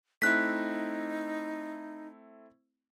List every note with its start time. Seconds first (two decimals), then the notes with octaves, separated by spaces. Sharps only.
0.22 A3 C4 D#4 E4 F#6 B6